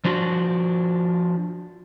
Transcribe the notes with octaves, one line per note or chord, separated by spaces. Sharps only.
F3 D4 F4 F#4